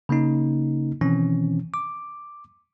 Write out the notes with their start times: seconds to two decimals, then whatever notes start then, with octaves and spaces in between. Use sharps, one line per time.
0.09 C#3 A#3 C#4 D#4
1.01 B2 D#3 E3 C4 C#4
1.74 D6